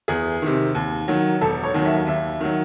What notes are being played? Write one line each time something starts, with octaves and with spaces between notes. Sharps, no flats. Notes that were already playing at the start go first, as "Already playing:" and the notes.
E2 G#4
C3 D#3
D#2
D#3 F#3
E1 A4
C#5
D#2 D#3 F#3
E5
D#2 E5
D#3 F#3